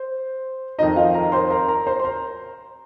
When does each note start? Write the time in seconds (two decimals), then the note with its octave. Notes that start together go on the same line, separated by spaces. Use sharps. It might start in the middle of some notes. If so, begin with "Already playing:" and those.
Already playing: C5
0.78 F2 D#3 C4 D#4 D#5
0.96 F4 F5
1.14 A#4 A#5
1.32 C5 C6
1.50 A#4 A#5
1.68 A#4 A#5
1.87 C5 C6
2.00 C6
2.04 A#4 A#5